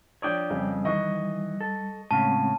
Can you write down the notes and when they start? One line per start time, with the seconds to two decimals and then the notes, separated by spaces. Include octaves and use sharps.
0.22 F3 D4 C#5 D5 G5 D#6
0.50 F2 C#3 G3
0.85 D#3 E3 D#5 C#6
1.60 A4
2.11 A2 C#3 G#3 C4 F5 F#5 A5